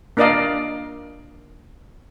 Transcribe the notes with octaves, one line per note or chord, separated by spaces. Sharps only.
A#3 D4 A#4 D5 D#5 F5